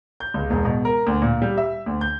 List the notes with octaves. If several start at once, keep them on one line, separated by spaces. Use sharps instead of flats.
G6
C#2
E1
B2
A#4
D2
A#2
G3
E5
D2
G6